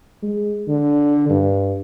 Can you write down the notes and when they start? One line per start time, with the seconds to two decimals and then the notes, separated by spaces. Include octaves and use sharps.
0.23 G#3
0.68 D3
1.29 G2